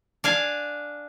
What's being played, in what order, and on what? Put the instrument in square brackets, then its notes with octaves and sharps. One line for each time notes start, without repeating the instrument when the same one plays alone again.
[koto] D4 F5 G#5